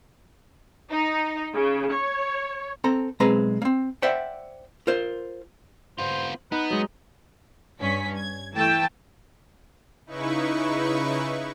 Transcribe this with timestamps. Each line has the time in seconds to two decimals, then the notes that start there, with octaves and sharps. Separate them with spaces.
0.91 D#4
1.55 C#3
1.93 C#5
2.84 C4 A4 A#5
3.20 B1 G#3 C4 B4 A#5
3.62 A#3 C4
4.02 C5 D5 E5 F#5 G5
4.87 F4 A#4 C5
5.98 B3 F4 C5
6.52 B3 D#4 B4
6.70 F#3 G#3 D#4
7.80 G2 C#4 B6
8.18 G#6
8.54 E3 A3 G5 A5
10.06 C#3 D#4 E4 B4 C#6